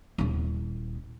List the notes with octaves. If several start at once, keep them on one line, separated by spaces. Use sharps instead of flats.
D#1 E4